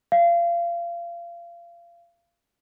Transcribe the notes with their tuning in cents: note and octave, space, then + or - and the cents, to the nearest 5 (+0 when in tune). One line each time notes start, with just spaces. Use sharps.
F5 -30